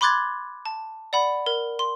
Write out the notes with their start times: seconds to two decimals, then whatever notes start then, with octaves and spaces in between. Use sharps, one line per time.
0.01 B5 C6 D6 F#6 G#6 A6
0.66 A5
1.13 D5 F#5 B5
1.46 A#4
1.79 C6